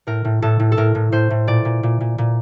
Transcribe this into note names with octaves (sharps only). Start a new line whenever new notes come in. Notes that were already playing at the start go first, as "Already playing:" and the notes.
A2 A#4
A2
A2 A4
A2
A4
A2 A#4
A2
A2 C5
A2
A#2 D5
A#2
A#2
A#2
A#2